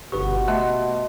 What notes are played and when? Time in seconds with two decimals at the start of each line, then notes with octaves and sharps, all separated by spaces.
0.12 G1 B2 B3 F#4 G4 B4 C#6
0.48 A3 D#5 E5 A5 C6